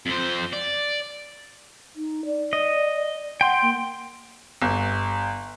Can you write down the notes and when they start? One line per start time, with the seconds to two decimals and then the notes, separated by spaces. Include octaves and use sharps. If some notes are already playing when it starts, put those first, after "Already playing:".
0.06 F2 C5
0.53 D5
1.96 D#4
2.26 D5
2.53 D#5
3.41 F#5 G5 C6
3.62 A#3
4.62 G1